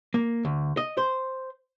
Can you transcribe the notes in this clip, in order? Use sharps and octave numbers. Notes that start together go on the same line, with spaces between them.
A#3
D2
D#5
C5